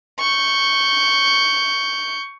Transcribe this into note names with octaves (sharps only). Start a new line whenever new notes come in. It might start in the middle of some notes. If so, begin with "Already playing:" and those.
C#6 G6